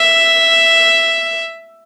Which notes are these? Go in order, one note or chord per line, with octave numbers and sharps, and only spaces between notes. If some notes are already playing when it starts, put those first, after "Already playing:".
Already playing: E5